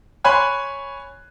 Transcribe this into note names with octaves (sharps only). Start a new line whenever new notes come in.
C#5 G#5 B5 C6 F#6